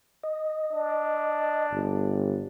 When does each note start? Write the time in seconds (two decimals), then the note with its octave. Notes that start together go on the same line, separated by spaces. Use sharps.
0.24 D#5
0.73 D4
1.72 G1